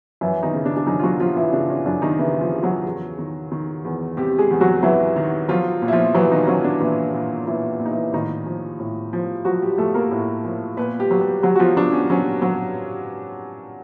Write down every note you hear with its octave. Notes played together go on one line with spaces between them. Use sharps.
F#2 E3 E4
D#3 D#4
C#3
D4
D4
F#2 D#3 D#4
F4
F#3 F#4
F3 F4
E3 E4
C#3 D4
C#4
F#2 D4
D#3 D#4
C#3 E3 E4
F3 F4
C#3
F#3 F#4
E2
D#3
D#3
E2
C3 G3 G4
G#3 G#4
E2
F#3 F#4
E3 F#3 E4
D#3
F3 F#3 F4
A#2
E4
F3 F4
E3 F#3 E4
D#3 D#4
F#3 C#4
D4
A#2 E3 E4
A#2
A#2 E3 E4
A#2
D#4
E3 E4
A2 D#3 D#4
F3
A2
F3
F3 F#3 F#4
G3 G4
F3 A3 A4
A#3 A#4
A2
F3
A#2 B3 B4
G3 G4
F#3
G3 G4
F#3 F#4
F#4
F3 F4
F#3 D4
C#4
F#3 C#4
F#3